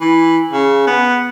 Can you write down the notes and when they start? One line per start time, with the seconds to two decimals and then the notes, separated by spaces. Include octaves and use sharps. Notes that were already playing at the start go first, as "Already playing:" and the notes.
0.01 E3
0.53 C#3
0.87 B3